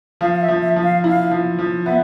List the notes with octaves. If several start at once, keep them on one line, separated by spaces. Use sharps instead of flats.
F3 F5
F5
E5
F3
E5
F3
F5
E4 F5
F3
F3
B3 E5